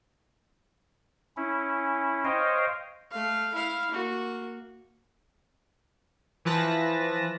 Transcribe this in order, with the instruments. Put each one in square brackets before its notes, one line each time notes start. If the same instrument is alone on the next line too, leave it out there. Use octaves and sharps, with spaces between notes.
[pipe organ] C#4 E4
C5 C#5 D#5 F5 G5
[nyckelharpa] A3 F5
E4 F5
A#3 F#4
[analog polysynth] E3 F3 B4 A5 A#6